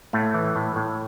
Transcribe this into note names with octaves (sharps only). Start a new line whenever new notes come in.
A2 A3
E3
A2
A2